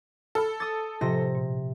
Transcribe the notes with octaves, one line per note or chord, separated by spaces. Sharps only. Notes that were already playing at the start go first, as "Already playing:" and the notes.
A4 B5 F6
D6 D#6 A6
A2 C3 F3 F4 A#6
A#2